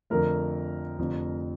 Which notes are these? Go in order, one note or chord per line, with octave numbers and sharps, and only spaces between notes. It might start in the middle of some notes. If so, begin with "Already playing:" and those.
F2 D3 F3 A3 A#4
F1 F2 D3 F3